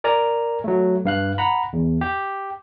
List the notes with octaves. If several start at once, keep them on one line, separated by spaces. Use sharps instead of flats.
A#4 D5 G#5 A#5
F#3 A3
G2 F5 F#6
F#5 A#5 B5
E2
G4